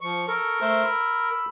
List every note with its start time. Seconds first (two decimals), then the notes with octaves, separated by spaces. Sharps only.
0.01 F3 C#6
0.28 A4 A#4 C#6
0.61 A3 C5 E5
0.84 B5 E6